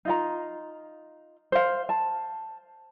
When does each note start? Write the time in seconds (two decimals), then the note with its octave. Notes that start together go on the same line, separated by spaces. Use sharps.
0.05 D#4 F4 A#5
1.52 C5 F5
1.89 A5